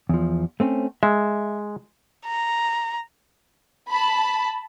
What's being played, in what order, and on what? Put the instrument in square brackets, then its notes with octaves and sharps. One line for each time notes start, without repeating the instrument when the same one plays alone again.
[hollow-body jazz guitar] E2 F3
A3 C4 C#4
[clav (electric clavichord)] G#3 [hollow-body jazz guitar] E5
[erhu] A#5
[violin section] A5 B5